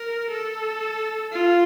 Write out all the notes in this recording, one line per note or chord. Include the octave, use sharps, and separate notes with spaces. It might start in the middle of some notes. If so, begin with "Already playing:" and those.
Already playing: A#4
A4
F4